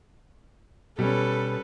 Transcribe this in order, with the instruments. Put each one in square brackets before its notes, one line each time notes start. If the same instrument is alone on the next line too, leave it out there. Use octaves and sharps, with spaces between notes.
[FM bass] B2 [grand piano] G3 C#4 [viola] A4 B4